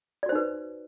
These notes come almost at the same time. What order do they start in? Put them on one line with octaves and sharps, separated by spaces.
D5 F#4 C5 D#4 B4